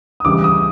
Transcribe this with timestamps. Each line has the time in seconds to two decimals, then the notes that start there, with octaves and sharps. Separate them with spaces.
0.20 D#6
0.25 C#2 C#3 E3 G3 D6
0.44 D#6